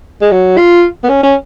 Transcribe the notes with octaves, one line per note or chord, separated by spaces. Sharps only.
G#3
F#3
F4
B3
C#4
C#4